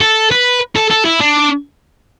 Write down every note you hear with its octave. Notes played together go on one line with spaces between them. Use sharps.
A4
B4
A4
A4
E4
D4